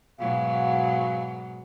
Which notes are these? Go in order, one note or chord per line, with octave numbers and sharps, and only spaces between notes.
G#2 B2 F#3 F5